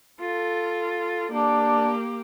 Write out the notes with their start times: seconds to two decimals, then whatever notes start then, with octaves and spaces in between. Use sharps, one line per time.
0.20 F4 A4
1.32 A#3 D4 G4